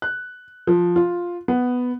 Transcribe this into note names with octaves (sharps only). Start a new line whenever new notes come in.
F#6
F3
F4
B3